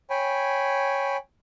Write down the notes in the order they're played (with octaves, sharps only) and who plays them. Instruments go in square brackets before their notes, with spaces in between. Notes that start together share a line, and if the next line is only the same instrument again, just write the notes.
[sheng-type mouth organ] C#5 G5 G#5 B5